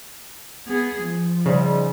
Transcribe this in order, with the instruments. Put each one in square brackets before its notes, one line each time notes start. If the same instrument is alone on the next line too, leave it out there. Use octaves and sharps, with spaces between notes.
[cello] B3 G#4
F3
[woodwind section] G#2 G3 [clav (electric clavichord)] C#3